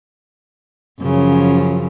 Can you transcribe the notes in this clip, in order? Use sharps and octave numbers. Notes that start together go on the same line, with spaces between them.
F#2 C#3 F3